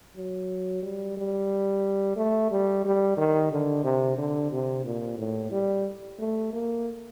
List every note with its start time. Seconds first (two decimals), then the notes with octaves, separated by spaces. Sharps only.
0.16 F#3
0.83 G3
1.17 G3
2.16 A3
2.51 G3
2.85 G3
3.17 D#3
3.52 D3
3.84 C3
4.18 D3
4.52 C3
4.85 A#2
5.18 A2
5.52 G3
6.19 A3
6.53 A#3